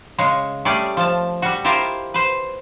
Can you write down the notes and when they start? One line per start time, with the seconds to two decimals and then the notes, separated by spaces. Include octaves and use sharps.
0.18 C#3 G#3 C#5
0.65 G3 A3 C#4 G4 G#4 D5
0.97 F3 A5
1.42 G3 F#4
1.64 E4 F4 G4 A#4 C5 D#5
2.14 B4 C5